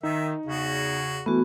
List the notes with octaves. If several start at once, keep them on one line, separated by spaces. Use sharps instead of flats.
D#3 D#4 E5
E2 C#3 F#4
E3 A3 B3 F#4